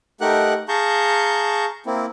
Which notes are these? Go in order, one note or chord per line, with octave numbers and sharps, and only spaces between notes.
A3 D#4 G4 A#4 F#5 F#6
G#4 F5 A5 A#5 C#6 G6
A#3 C4 E4